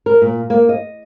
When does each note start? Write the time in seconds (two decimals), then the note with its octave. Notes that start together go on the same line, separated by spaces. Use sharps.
0.06 A#4
0.22 A#2
0.50 A#3
0.69 D#5